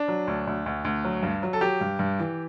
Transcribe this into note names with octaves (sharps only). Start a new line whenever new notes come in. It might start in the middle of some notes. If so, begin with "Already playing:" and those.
Already playing: D4
F#3
D2
D2
D2
D2
F#3
G2
F#3
A4
F#3 G4
G2
G2
E3